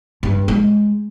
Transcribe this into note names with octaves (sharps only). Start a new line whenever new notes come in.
G2
G#3